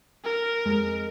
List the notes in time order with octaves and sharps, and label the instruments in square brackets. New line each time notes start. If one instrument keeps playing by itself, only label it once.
[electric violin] A#4
[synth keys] F2 G#3